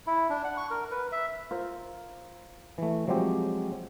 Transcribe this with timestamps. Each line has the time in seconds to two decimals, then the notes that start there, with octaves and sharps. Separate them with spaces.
0.07 E4
0.30 D4
0.44 F#5
0.57 C#6
0.70 A#4
0.91 B4
1.12 E5
1.51 F4 A#4 C5
2.78 E3 A3
3.08 F3 F#3 G#3 C4 G4